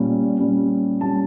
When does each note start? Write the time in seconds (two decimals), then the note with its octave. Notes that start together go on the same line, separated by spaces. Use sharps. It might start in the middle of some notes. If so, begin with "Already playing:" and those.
Already playing: A#2 G3 C#4
0.39 A#2 G3 C#4
1.01 A#2 G3 C#4 A5